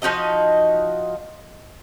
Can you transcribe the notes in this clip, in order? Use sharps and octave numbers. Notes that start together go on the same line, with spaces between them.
F3 D#4 F#4 D#5